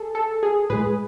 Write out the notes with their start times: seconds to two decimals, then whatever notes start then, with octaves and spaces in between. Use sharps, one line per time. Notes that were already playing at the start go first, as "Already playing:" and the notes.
Already playing: G#4 A4
0.15 A4
0.43 G#4
0.70 A2 G#3 G#4 B4